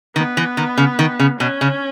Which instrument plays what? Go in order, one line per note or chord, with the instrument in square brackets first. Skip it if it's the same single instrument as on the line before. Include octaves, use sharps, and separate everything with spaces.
[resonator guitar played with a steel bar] D#3 [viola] B3
[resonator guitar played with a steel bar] E3
D#3
C#3
D#3
C#3
[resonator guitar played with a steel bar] B2 [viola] C#4
[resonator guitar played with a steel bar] C#3